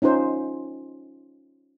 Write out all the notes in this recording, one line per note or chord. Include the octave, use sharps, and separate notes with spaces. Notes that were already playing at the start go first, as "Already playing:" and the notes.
C#4 D#4 F4 C5